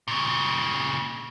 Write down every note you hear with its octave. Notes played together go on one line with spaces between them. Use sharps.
A#2 C#3